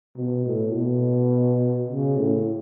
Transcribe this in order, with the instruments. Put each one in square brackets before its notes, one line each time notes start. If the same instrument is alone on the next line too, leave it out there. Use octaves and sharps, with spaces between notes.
[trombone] B2
A2
B2
C#3
A2